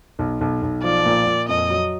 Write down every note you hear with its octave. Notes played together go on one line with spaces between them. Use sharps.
B1
B1
B1
F3 D5
A#2
A#2
F2 D#5
F#3